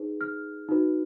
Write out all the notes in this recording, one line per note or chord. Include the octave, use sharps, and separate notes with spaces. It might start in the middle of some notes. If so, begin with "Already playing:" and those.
Already playing: D#4 G#4 B4
F6
D#4 F#4 B4